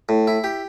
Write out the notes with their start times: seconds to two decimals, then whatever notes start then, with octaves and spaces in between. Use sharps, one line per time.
0.09 A2
0.27 E4
0.44 G4